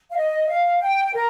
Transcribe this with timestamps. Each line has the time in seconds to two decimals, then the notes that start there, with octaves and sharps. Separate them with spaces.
0.11 F5
0.16 D#5
0.48 F5
0.81 G5
1.14 A#4